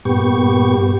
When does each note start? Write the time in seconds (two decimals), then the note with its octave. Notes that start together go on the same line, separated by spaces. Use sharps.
0.05 G2 A#2 B3 G4 C#6